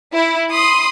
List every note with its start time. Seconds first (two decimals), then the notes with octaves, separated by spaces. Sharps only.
0.14 E4
0.51 B5 C6 D#6